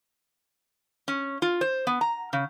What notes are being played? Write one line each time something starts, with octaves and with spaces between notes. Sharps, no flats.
C#4
F4
C5
B3
A#5
C#3